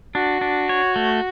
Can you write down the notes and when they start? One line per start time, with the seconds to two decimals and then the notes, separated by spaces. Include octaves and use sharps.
0.15 D4 F#4
0.41 D4
0.69 C#5
0.96 A3